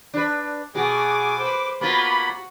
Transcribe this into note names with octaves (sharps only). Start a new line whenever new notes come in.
D4 B4
B2 F#4 G#4 G#5 D6
B4 C5
A#3 B3 F4 F#4 B5